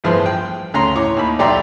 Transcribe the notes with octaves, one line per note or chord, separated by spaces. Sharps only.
A1 G2 F3 B3 G#4 C6
G5
D2 C#3 C#4 A#5 C6
A2 C#5 D6
D#2 B5
B1 G4 D5 E5 A#5 C6